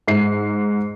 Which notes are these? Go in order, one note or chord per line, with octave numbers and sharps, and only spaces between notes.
G#2 C7